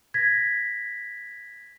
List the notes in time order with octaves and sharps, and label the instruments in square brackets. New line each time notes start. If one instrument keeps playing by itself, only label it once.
[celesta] G#6 A#6 B6